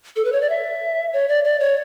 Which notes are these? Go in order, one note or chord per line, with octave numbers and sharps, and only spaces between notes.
A4
B4
C#5
D5
E5
C#5
D5
D5
C#5